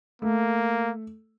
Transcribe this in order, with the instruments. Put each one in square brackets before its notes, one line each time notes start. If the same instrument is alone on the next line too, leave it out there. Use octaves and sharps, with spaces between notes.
[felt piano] A3 [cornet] A#3